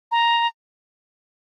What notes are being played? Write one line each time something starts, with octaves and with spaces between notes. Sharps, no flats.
A#5